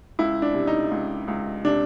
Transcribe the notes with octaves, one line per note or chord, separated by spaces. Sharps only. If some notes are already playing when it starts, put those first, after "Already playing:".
C#2 E4
D4
C3
D#4
C#2
C#2
C3 D4